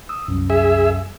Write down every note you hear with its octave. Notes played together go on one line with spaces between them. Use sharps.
D#6 E6
C2 F#2
G#4 E5